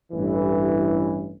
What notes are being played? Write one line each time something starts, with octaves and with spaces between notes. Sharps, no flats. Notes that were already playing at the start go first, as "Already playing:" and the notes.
A1 G2 E3